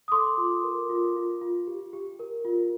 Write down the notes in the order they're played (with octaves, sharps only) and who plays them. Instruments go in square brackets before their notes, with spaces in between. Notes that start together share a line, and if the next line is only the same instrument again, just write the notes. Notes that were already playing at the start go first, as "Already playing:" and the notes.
[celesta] D#6
A4 C6 D6
F4
A#4
F4
F4
F4
G4
G4
A#4
F4